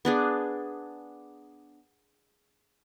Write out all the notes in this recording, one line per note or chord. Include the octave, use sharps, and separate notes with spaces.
B3 D4 G#4